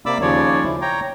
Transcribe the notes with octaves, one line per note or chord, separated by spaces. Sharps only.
C3 A#3 D5 B5 D6 E6
D#2 C#3 F3 C#5 D5
E4
C#5 G5 A#5